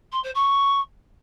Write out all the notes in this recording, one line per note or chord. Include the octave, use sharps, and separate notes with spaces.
C6
C5
C#6